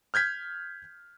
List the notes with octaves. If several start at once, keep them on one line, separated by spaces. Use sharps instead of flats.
F6 G6 G#6 B6